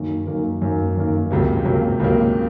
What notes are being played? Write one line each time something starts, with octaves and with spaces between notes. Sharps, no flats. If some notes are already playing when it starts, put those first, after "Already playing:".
Already playing: F#2 D#3 A#3
F#2 D#3 A#3
F#2 D#3 A#3
F#2 D#3 A#3
C#2 C3 F#3 A#3
C#2 C3 F#3 A#3
C#2 C3 F#3 A#3